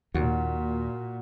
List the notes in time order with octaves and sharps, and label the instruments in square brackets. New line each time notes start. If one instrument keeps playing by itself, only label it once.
[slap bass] D#2 [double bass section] A#2 [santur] F#4